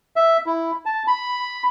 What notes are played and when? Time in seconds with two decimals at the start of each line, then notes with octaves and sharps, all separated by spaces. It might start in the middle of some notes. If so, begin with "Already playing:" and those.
0.16 E5
0.46 E4
0.86 A5
1.07 B5